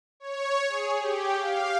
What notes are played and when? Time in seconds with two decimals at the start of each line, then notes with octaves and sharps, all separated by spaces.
0.20 C#5
0.69 G#4
0.99 G4
1.39 F5